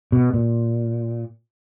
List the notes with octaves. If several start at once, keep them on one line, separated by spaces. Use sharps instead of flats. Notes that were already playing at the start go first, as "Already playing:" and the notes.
B2
A#2